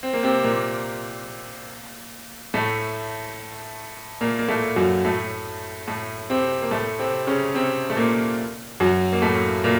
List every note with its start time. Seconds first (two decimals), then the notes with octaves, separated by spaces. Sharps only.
0.03 C4
0.13 A#3
0.23 C3 C4
0.44 A#2 A#3
2.54 A2 A3
4.21 A#2 A#3
4.39 A#3
4.48 A2 A3
4.76 F#2 F#3
5.04 A2 A3
5.88 A2 A3
6.30 C3 C4
6.62 A#3
6.71 A2 A3
6.99 C3 C4
7.27 C#3 C#4
7.54 C3 C4
7.90 A3
7.97 A#2 A#3
8.80 F#2 F#3
9.13 A#3
9.22 A2 A3
9.64 A#2 A#3